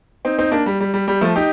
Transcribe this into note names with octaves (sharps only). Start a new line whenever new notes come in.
C4 D#4
C4 D#4
A#3 D4
G3
G3
G3
G3
F3 A3
D#4 G4